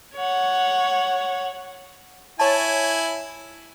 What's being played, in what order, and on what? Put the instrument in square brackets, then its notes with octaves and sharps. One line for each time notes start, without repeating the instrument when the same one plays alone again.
[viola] C#5 F#5
[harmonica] E4 G#5 [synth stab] C#5 A5